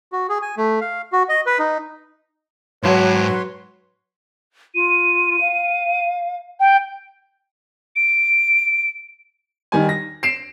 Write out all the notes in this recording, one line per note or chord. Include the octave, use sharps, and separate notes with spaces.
F#4
G#4
G#5
A3
F5
F#4
D#5
B4
D#4
G#2 F#3 B4 C#5 A5 C6
F4 D#7
F5
G5
D7
D#3 G3 G#5
A#6
C7 D7 E7